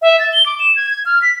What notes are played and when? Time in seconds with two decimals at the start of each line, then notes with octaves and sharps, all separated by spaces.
0.02 E5
0.19 A6
0.33 G7
0.46 D6
0.59 E7
0.76 G#6
0.90 G#6
1.06 F6
1.22 B6